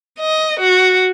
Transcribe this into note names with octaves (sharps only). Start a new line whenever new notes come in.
D#5
F#4